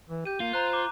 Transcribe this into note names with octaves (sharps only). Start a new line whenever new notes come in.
E3
G4 G6 D#7
A#3 F4
C5 A#5 F#6
A#5 D6